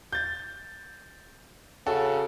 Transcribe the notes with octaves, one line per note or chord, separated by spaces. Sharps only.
G6 A6
C#3 F#4 A4